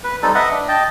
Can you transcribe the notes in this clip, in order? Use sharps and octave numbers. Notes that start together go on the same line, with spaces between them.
B4
G3 C4 D#4 A4
B4 D#5 E5 F#5
D4
D#5 G5 A5